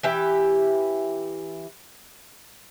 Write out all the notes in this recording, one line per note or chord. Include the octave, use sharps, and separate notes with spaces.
E3 G4 E5